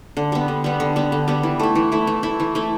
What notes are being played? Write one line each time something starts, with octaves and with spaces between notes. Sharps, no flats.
D3
G3 B3
D3
G3 B3
D3
G3 B3
D3
G3 B3
E3
A3 E4
E3
A3 E4
E3
A3 E4
E3
A3 E4